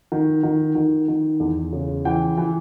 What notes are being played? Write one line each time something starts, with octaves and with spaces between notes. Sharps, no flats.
D#3
D#3
D#3
D#3
E2
C#3
E3 G5
E3